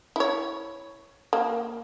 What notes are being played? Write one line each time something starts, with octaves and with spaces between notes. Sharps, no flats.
E4 C#5
A#3